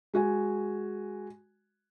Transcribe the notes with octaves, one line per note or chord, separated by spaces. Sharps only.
G#3 F#4 G#5